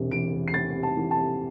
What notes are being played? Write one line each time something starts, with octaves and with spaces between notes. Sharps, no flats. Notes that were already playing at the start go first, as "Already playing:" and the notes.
Already playing: E1 C3
E2 D7
E1
C7
C3 A6
C3
A5
E3
A5
C3